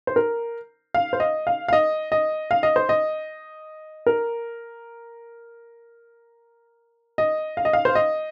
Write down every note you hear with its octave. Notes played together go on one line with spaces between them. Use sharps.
C5
A#4
F5
C5
D#5
F5
F5
D#5
D#5
F5
D#5
C5
D#5
A#4
D#5
F5
D#5
F5
C5
D#5